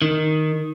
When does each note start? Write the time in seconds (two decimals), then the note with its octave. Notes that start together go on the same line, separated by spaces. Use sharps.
0.02 D#3